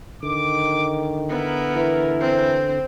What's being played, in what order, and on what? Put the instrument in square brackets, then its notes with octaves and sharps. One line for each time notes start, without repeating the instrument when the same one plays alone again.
[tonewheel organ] D3 [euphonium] D#3 [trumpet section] D6
[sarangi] B3 [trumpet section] E4 A#4
[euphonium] E3
[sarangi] C4